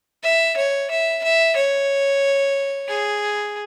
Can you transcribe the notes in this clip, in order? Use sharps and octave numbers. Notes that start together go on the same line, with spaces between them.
E5
C#5
E5
E5
C#5
G#4